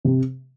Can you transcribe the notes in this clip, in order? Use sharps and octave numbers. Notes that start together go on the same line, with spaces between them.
C3